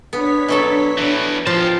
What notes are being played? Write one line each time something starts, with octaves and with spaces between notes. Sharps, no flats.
B3 D4 C#5 B6
B2 F#3 A4
A2 E3
F3 A#4 G5 A5 C7